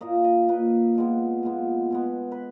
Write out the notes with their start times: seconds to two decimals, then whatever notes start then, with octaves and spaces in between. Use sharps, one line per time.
0.01 A#2 A#3 D#5
0.24 D#5
0.49 A#2 A#3 B4
0.95 A#2 G#3 B3
1.43 A#2 G#3 B3
1.90 B2 G#3 B3
2.32 B4